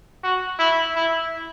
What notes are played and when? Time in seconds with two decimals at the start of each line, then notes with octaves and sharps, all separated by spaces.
0.23 F#4
0.59 E4
0.95 E4